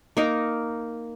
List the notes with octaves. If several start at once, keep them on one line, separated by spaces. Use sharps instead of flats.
A#3 D#4 A#4